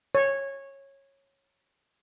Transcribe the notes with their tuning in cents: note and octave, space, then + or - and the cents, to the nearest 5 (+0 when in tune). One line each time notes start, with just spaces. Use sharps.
C#5 -15